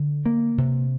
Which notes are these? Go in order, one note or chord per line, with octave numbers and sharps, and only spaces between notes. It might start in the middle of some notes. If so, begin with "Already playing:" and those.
Already playing: D3
A#3
C3